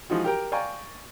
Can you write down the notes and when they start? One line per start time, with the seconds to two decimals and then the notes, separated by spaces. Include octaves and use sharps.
0.10 E3 F3 G#3 D#4 F4 F#4
0.24 G4 A#4 G5
0.52 D5 F5 G5 G#5 A#5 C#6